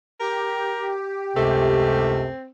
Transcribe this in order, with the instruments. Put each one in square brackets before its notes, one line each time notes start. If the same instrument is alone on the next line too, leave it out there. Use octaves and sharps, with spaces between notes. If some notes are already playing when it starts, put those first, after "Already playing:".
[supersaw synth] G4 [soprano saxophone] A#4
[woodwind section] C#2 F#2 C3 [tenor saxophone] A3 [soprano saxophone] C4